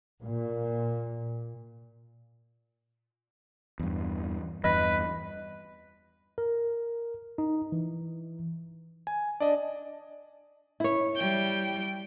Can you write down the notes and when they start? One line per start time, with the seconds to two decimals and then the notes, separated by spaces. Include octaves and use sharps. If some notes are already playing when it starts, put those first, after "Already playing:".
0.22 A#2
3.79 E2 G2
4.64 E2 G2 B4 D#5
6.38 A#4
7.38 D#4
7.72 E3
9.07 G#5
9.40 D4 D5 D#5
10.80 E4 C#5
11.16 G3 G5